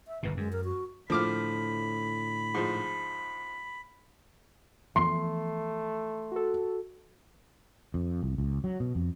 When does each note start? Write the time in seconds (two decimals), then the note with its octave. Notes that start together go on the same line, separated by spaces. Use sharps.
0.08 E5
0.23 G1 G#2 B2 B4
0.37 F#2 G#3
0.52 A#4
0.64 F#4
1.10 A2 D3 F3 B5 D6 F6
2.54 G#2 F3
4.96 E3 F3 A3 B3 C6
6.32 F#4 A4
7.94 F2
8.23 C2
8.38 C#2
8.64 F#3
8.80 B2
8.95 F2